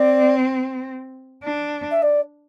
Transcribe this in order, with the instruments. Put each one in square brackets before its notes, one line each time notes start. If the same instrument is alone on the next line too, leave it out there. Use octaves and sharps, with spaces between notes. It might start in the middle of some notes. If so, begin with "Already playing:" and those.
Already playing: [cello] C4 [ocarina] D5
[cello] D4
[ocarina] E5
D5